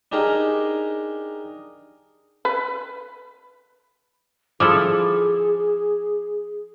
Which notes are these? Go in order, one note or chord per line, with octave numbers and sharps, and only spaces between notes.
D4 D#4 G4 G#4 A#4
B4
F3 E4 G#4 A4 D6